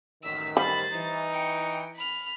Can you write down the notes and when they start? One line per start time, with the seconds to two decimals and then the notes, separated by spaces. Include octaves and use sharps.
0.23 A1 F#2 D#3 E6 B6
0.57 G3 C5 B5 A6
0.93 E3 D#4
1.32 G5 C#7
1.95 B5 F6